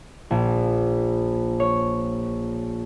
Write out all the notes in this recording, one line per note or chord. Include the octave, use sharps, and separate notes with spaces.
A#1
C#5